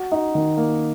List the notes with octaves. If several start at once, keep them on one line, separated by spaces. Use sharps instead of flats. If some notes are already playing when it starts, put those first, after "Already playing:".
Already playing: F#4
D#4
D#3
A#3